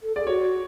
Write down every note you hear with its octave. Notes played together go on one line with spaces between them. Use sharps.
A4
G#4 D5
F#4 C#5